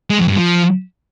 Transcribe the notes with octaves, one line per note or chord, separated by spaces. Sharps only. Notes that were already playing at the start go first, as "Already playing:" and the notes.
G#3
F2
G2
F3